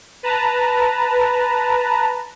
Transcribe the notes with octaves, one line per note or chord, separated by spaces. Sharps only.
B4 A5 A#5